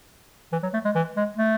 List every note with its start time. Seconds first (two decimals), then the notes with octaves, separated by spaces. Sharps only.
0.52 E3
0.63 F#3
0.73 A3
0.85 G#3
0.95 E3
1.17 G#3
1.37 A3